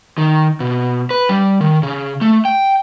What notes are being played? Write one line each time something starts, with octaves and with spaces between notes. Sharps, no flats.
D#3
B2
B4
G3
D#3
C#3
A3
G5